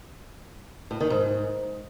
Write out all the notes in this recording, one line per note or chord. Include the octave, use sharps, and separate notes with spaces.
A2
D#3
G#2